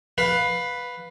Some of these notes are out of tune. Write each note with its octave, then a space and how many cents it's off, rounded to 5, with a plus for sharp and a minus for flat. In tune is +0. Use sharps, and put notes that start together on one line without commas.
B4 +0 F5 +20